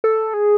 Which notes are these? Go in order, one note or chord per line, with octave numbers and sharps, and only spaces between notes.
A4
G#4